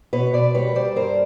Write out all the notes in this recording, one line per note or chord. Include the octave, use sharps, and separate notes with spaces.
B2 B4 C#5
B2 C5 D5
G3 B4 C#5
G3 C5 D5
G2 A#4 C5